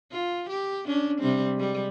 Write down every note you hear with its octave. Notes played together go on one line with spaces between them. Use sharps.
F4
G4
C#4 D4
C3 G3 C4
G3 G#3